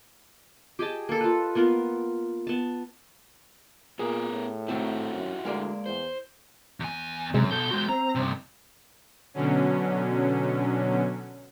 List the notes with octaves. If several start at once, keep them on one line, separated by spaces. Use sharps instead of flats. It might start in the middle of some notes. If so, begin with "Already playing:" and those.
G4 G#4 D#5 A5
A#3 A4
F4 B4
A#3 B3 F4 A#4
B3 A5
A#2 B3 G#4 A#4
A2
D#3 A3 C4 E4 F#4 G4
F#2
D2 G#3 A#3 D5
E2 C5
E2 G#5
F#2 C3 G#3
B2 A4 G6
G#3 F#4
C4 A#5
G2 C3
B2 D3 F#3 C#4